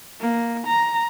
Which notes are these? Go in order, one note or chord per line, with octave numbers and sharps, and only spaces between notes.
A#3
A#5